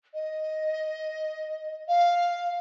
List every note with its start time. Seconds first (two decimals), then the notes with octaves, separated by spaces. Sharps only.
0.14 D#5
1.88 F5